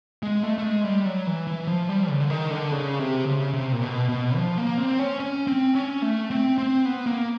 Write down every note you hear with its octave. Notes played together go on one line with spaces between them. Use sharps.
G#3
A3
A3
G#3
G3
F#3
E3
E3
F3
G3
C#3
D3
D#3
D3
C#3
C3
C#3
C3
A#2
B2
B2
F3
A#3
C4
C#4
C#4
C4
C#4
A3
C4
C4
B3
A#3